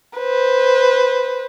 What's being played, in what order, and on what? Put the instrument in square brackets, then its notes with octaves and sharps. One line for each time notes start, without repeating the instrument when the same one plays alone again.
[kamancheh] B4 C5